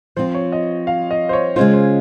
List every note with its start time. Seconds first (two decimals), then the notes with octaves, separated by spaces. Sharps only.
0.17 F3 C4 F4 C5
0.35 C#5
0.52 D#5
0.87 F5
1.11 D#5
1.29 C5
1.33 C#5
1.56 C#3 G#3 C#4 F4 C5
1.73 C5